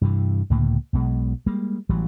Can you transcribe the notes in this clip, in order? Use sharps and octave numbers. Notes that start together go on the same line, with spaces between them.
G2 C3 E3
C#2 A2 D3 A#3
B1 B2 G#3
G3 G#3 A#3
A1 E3 F#3 G3